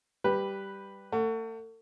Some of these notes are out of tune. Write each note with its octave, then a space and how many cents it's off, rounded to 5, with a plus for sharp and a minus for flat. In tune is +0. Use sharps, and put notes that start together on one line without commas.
G3 +0 G4 +0 B4 +0
A3 +35 F#5 +0